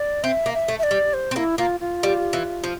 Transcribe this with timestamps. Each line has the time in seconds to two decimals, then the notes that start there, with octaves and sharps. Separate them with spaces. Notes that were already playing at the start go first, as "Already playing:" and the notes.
Already playing: D5
0.23 C4 E5
0.46 A#3
0.54 E5
0.68 A3
0.79 E5
0.83 D5
0.91 G3
1.13 C5
1.31 C4
1.36 A#3 E4
1.58 A#3 F4
1.80 F4
2.03 G3
2.33 E3
2.64 F3